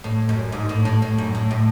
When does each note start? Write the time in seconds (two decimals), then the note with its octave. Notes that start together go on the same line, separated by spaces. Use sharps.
0.04 A2
0.29 F#2
0.52 G#2
0.69 A2
0.85 A2
1.02 A2
1.18 F#2
1.35 A2
1.51 A2